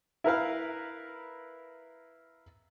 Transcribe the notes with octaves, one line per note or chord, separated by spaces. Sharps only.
E4 A#4 B4 F5